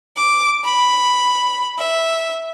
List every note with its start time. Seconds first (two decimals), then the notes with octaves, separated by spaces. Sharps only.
0.19 D6
0.65 B5
1.79 E5